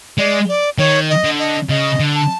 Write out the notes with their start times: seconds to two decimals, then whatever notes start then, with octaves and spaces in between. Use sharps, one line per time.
0.18 G#3 D5
0.48 D5
0.78 D#3 C#5
1.09 D#5
1.24 D3
1.39 D#5
1.69 C#3 D#5
2.00 D3
2.15 A5